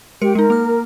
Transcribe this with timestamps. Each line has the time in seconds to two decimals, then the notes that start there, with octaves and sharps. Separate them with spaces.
0.22 G#3 G4 A#4 G5 C#7
0.35 G#3 D#4 A#4
0.50 A#3 F6